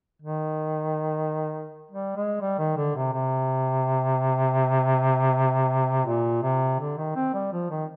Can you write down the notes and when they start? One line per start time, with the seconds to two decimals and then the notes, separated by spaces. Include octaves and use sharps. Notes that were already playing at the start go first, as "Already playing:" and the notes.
0.22 D#3
1.91 G3
2.16 G#3
2.41 G3
2.58 D#3
2.77 D3
2.96 C3
3.13 C3
6.06 A#2
6.42 C3
6.79 D3
6.98 D#3
7.16 C4
7.34 G3
7.52 F3
7.70 D#3